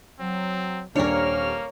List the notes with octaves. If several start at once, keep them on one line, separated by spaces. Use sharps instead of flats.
F#3 C4
D#1 C3 A#3 D4 A#4 C#5 C#6 F6